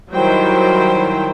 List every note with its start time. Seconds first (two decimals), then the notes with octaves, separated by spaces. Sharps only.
0.13 D#3 F#3 G3 E4 C5 G5